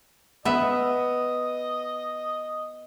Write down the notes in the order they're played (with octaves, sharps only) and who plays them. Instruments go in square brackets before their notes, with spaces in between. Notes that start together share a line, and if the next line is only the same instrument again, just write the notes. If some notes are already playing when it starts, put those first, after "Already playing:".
[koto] B3 E5 [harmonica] D#5